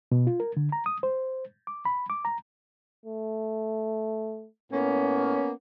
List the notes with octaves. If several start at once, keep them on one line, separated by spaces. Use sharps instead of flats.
B2
F4
A#4
D3
A#5
D#6
C5
D6
B5
D6
A#5
A3
A2 A#3 B3 C#4